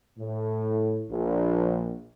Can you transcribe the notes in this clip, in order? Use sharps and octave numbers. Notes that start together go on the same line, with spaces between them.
A2
A#1